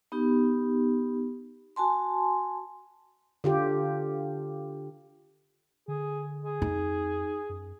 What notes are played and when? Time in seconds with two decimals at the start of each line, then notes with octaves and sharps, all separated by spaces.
0.12 B3 D#4 G4
1.76 F#4 G#5 A5 C6
3.44 D3 F4 G4
5.88 D3 G#4
6.45 G#4
6.62 F2 D#4
7.49 F#2